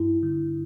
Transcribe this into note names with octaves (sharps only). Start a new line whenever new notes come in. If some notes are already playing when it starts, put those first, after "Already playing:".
Already playing: G2 E4
D3